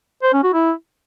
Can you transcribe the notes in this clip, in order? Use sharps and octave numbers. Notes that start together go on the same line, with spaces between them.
C5
C#4
F#4
E4